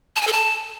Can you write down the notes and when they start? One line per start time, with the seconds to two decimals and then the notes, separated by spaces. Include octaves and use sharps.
0.16 A5
0.22 G#5
0.27 A4
0.33 A5